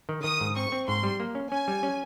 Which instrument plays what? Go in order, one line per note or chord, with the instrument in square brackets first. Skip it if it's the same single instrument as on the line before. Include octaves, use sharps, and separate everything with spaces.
[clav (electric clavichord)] D#3
[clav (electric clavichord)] D#3 [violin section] D#6
[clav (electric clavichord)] G#2
[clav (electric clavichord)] C4 [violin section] C#6
[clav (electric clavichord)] C4
[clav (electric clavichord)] G#2 [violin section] C6
[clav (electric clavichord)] G3
A#3
C#4
[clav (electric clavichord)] C#4 [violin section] G#5
[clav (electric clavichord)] G3
C#4